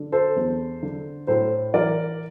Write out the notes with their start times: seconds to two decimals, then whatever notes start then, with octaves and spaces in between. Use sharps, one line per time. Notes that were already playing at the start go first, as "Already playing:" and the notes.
Already playing: D3
0.12 A4 C5
0.36 E2
0.83 D3
1.27 A2 A4 C5
1.74 E3 A#4 D5